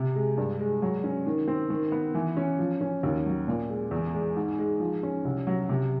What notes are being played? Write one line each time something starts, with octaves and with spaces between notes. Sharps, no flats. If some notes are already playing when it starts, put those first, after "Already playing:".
Already playing: C3
G#3
G2
G#3
F#3
C#4
D#3
C4
D#3
B3
E3
C#4
F3
C#4
D#2
F#3
A#2
G#3
E2
G#3
G#2
G#3
F3
C#4
C2
F#3
C3